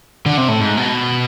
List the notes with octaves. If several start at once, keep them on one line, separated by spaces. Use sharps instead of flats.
D3
C3
A2
G#2
B2